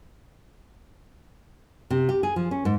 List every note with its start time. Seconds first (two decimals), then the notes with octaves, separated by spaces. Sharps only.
1.90 C3
2.09 G4
2.23 G#4
2.36 F3
2.51 C#4
2.65 G#2